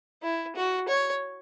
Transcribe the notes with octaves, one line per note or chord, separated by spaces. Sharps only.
E4
F#4
C#5